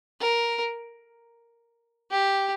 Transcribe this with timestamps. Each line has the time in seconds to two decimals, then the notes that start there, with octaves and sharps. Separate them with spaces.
0.20 A#4
2.10 G4